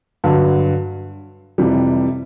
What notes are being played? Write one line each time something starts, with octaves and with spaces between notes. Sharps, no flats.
G2 D3 F#3
F2 C3 E3 G3